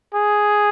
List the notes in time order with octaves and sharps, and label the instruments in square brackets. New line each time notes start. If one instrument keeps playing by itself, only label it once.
[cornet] G#4